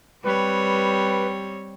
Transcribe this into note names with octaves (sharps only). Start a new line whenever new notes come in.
G3 C4 B4 C#5